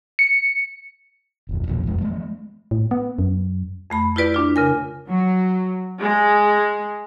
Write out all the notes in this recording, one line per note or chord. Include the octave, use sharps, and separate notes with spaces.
C#7
F#1 D#2
B1 F2 A#2 F3
E1 F2 G#3
F3 G#3 A3
A2
B3
F#2
F2 A3 B5
E4 F4 G4 B4 D5
D4 F4
C#3 A#4 G#5
F#3
G#3